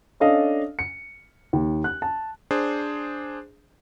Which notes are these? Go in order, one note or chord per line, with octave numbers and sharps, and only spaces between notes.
C#4 D4 A4 D#5 F5
C#7
D#2
F#6
A5
D4 G#4 C5